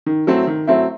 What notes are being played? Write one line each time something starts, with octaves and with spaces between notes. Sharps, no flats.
D#3
F#3 A3 C4 E4
D#3
F#3 A3 C4 E4